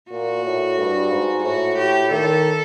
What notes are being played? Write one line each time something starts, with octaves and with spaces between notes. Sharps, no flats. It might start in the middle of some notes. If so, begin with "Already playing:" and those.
A#2 F#4
A2
G2
G#2
A2 F#4
G4
D#3 A4